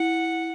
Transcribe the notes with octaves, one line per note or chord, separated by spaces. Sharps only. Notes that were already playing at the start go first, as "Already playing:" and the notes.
Already playing: E4 F#5